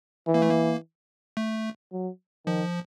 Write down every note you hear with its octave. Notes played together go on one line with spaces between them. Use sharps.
E3
A#3
A3
A#3
A3
F#3
D#3 F3